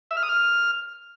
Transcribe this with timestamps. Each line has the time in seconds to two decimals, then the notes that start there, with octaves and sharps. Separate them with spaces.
0.11 E5
0.17 F6
0.23 D#6
0.29 F6